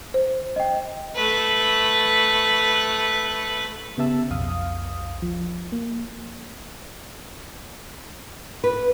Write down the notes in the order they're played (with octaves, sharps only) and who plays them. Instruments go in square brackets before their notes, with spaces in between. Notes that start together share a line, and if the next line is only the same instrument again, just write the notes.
[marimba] C5
[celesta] D#5 G5
[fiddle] A3 B4
[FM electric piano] C#3 B3 G4 E5 A5 E6
B1 F2 F5 D#6
F3
A#3
[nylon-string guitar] B4